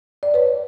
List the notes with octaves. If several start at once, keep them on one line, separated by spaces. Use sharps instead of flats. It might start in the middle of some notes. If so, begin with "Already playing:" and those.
D5
B4 C#5